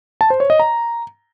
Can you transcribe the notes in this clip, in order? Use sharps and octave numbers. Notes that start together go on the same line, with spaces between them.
A5
C5
C#5
D#5
A#5